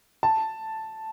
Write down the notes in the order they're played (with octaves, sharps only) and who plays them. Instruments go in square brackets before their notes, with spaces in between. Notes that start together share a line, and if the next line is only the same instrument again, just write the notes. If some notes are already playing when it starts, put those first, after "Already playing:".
[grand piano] A5